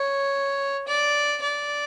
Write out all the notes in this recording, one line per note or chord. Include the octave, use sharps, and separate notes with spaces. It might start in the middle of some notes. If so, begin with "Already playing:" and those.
Already playing: C#5
D5
D5